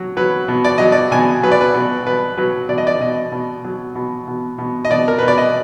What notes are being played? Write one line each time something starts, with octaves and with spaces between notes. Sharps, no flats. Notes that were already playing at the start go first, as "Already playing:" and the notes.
Already playing: F#3
F#3 B4
B2
D5
F#3 D#5
D5
B2 G#5
F#3 B4
D5
B4
B2
B2 B4
F#3 B4
B2 D5
D#5
D5
B2 D#5
B2
F#3
B2
B2
B2
D#5
B2 D5
A#4
B2 B4
D5
D#5